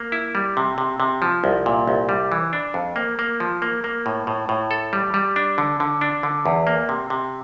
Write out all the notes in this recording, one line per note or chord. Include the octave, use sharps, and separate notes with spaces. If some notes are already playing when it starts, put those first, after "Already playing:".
Already playing: A#3
E4
G3
C3
C3
C3
F3
C2
A#2
C2
G3
E3
D4
F2
A#3
A#3
F3
A#3
A#3
A2
A2
A2
A4
G3
G3
D4
D3
D3
D4
D3
E2
A#3
C3
C3